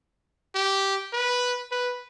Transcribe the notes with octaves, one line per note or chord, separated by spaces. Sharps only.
G4
B4
B4